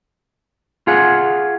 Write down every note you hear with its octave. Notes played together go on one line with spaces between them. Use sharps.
F4 G#4 F#5